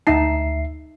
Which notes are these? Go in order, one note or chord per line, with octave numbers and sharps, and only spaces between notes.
D2 D#4 E5 A5 C7